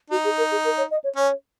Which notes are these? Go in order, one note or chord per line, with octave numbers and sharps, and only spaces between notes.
D#4 F#4
G#4
A#4
G#4
A#4
C#5
D#5
C#5
C#4 C#5